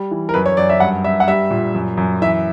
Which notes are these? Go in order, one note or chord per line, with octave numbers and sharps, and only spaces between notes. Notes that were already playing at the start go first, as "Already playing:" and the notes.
Already playing: G3
E3
A#4
F#2 B4
C#5
F#2 D5
E5
G2 F#5
G2 E5
F#5
G3 E5
A#2
F#2
F#2
E3 E5